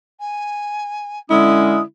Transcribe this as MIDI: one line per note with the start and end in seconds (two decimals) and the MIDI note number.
0.20 1.19 80
1.30 1.78 50
1.30 1.78 56
1.30 1.78 61
1.30 1.81 64
1.30 1.82 87